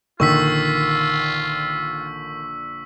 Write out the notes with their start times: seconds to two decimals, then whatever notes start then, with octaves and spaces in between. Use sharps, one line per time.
0.20 A#1 D3 D#3 F4 C#6 E6 B6